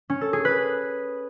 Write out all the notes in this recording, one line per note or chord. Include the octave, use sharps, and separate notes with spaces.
C#4
A4
G#4
B4